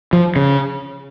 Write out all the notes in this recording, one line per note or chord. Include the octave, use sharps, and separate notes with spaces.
F3
C#3